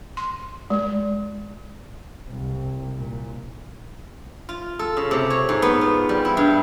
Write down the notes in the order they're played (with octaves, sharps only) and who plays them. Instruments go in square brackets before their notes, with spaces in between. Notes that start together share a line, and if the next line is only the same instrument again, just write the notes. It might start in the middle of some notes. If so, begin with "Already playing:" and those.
[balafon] C6
G#3
[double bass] C2
A#2
[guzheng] F4
A4
C#3
C3
C#5
G#2
B3
F4
G3
E4
G2